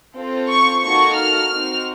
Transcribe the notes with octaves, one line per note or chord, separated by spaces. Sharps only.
C4 F4 A4
C#6
A#3 D#4 F#4 A4 C#6
F6
C4 D#4 F#4